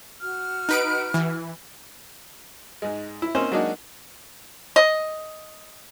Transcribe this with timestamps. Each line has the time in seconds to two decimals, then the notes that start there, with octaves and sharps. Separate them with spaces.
0.21 F#4 F6
0.69 D#4 B4 D7
1.14 E3
2.82 G#2 G#3
3.22 E4
3.35 A#3 C4 C#4 D#4 C5
3.52 F#3 G#3 A#3 D4 D#4 F#4
4.76 D#5